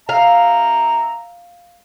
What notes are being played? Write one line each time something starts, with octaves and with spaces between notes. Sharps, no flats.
E5 F5 A#5